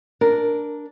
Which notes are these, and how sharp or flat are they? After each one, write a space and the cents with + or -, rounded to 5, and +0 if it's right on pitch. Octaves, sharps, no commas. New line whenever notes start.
D4 +0 A#4 +0